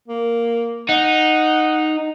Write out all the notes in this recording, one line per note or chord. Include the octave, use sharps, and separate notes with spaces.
A#3
D#4 F#5